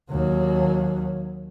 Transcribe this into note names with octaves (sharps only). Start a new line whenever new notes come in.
D#2 F#3